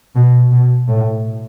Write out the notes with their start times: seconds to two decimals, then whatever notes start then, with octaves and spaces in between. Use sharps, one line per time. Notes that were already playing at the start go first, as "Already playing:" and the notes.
0.16 B2
0.51 B2
0.88 A2